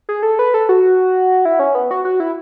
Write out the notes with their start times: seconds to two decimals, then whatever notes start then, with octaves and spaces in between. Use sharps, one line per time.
0.09 G#4
0.23 A4
0.39 B4
0.54 A4
0.69 F#4
1.45 E4
1.59 C#4
1.75 B3
1.91 F#4
2.05 F#4
2.20 E4